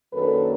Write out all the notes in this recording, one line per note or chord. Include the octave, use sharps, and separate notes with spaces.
F#2 D#3 F#3 A#3 D4 A4 B4